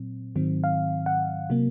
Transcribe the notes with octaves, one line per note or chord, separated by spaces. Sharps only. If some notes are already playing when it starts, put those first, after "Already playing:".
Already playing: A#2 F#3 C4
G#2 D#3 F#3 C4
F5
F#5
C3 F#3 A#3